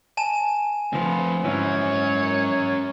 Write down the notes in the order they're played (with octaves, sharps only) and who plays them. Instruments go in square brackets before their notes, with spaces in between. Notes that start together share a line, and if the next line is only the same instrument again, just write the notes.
[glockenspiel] G#5 A5 E7
[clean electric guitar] D2 F3 [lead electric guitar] C4 B4
[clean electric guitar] G#2 E3 [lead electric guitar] C#4 F#4 [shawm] C#5